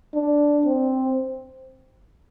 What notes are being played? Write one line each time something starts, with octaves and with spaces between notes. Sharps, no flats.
D4
C4